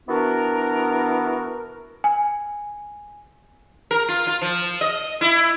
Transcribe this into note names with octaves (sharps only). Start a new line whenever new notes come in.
E3 B3 D4 F#4 A#4
G#5
A#4
F4
F4
F3
D#5
E4